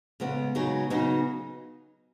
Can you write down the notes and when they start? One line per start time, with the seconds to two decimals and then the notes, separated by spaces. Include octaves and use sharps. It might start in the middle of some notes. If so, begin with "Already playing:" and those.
0.20 C#3 G#3 B3
0.55 C#3 F#3 B3 D#4 G#4
0.90 C#3 F#3 B3 D#4 G#4